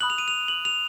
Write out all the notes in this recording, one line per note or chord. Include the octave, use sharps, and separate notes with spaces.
B5 D#6 F#6 F#7
F7
D#7
F7
F#7
F7